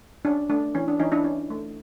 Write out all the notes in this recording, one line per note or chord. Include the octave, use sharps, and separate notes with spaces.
C#4 D4
A3 D4
E3 C#4
D4
E3 C#4 D#4
D4 E4
C#4
A3